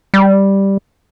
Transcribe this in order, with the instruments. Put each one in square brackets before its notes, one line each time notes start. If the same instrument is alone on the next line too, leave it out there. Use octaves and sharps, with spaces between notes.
[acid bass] G3